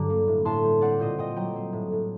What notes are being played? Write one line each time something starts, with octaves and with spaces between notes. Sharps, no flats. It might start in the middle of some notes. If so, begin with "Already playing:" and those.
Already playing: G2 D3 F#3 A#5 D6
A#3
A2
A2 A5 C6
G3
C4 D5 F#5
A#2 C5 D#5
A#2 D#5 G5
F#3 G5 A#5
C4
A2
A2